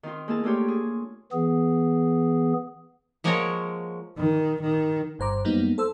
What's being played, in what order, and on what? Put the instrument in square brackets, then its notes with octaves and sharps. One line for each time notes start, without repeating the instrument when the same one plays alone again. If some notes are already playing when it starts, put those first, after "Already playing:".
[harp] D#3 C4 D#4 F4
G#3 A#3 E4 G#4 A#4 A5
A3 A#3 D4 F4 G4 C#5
G#4
[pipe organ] E3 B3 G#4
[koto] F3 G#3 A#3 F#4 A#4 C#5
[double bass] D#3
D#3
[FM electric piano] G1 G2 C5 A#5 D6
F#2 F#3 G3 A#3 B3 D#4
A4 C5 E6